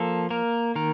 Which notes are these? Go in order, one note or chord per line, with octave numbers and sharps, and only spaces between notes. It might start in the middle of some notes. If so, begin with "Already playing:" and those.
Already playing: F3 A#3 A4
A#3 A#4
D#3 A#4